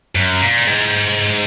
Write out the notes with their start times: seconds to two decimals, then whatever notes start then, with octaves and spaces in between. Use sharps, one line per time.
0.15 F#2
0.41 A#2
0.67 G#2